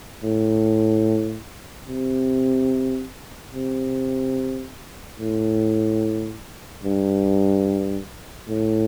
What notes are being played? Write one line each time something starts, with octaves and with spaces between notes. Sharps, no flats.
A2
C3
C3
A2
G2
A2